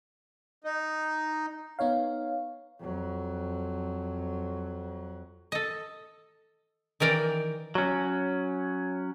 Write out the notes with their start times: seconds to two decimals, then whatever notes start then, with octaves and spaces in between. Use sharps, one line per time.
0.64 D#4
1.79 B3 D#4 C#5 F5
2.80 F2 F#3
5.52 A4 D#5
7.00 D#3 E3 A#4 D5 G5
7.75 F#3 C#4